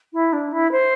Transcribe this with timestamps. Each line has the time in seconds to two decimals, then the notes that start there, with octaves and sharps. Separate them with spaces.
0.13 E4
0.32 D4
0.52 E4
0.71 C5